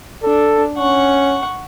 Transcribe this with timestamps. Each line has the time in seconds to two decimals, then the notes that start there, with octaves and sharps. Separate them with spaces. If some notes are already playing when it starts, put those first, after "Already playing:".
0.23 D4 A4
0.78 C#4 F#5 C#6